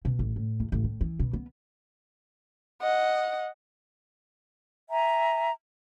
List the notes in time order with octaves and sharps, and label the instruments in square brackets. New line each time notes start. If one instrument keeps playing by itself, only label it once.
[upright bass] B2
A1
A2
E2
A1
A2
E3
B2
B3
[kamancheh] D#5 F#5
[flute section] E5 G#5 A#5